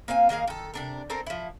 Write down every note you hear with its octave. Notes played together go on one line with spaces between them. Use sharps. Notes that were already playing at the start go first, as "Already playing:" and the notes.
A#3 C4 F5 G#5
D#3 A#3 G#4 F5
D#3 A4
C3 D4 A#4
C4 A4 A#4 C5
F3 E4